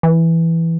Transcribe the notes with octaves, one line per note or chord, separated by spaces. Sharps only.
E3